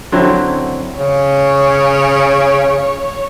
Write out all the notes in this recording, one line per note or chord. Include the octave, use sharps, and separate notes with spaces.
D3 F#3 C4 E4
C#3 C#5